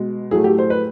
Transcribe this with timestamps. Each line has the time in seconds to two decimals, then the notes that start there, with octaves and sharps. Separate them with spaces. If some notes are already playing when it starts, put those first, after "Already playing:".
Already playing: B2 G#3
0.31 A2 F#3 A3 G#4
0.44 G4
0.58 C5
0.70 B4